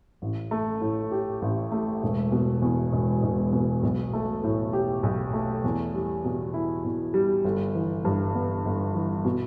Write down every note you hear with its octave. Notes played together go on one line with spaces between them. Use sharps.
A1
A3
A2
G4
A1
A3
E1
B2
E2
E1
E1
B2
B1
A3
A2
G4
B1
A3
E2
G3
B2
E4
E2
G3
G1
E3
G2
B3
G1
E3
B2